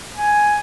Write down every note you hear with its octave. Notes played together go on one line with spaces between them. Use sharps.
G#5